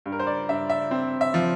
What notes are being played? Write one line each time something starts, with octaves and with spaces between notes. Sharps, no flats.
G2
A#4
C5
D5
G2 E5
E5
C4
E5
F3